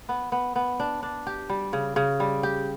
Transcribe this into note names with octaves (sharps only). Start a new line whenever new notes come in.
B3
B3
B3
D4
D4
G4
G3
C#3
C#3
G3
G4